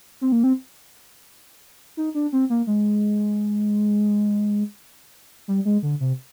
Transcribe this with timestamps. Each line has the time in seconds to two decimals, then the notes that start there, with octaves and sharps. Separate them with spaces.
0.21 C4
0.32 A#3
0.44 C4
1.97 D#4
2.15 D4
2.32 C4
2.50 A#3
2.67 G#3
5.48 G3
5.65 G#3
5.83 D3
6.00 C3